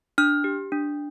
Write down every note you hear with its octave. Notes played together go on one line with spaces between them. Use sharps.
D4 F6
G4
D4